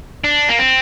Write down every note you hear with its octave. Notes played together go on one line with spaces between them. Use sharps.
D4
A#3
C4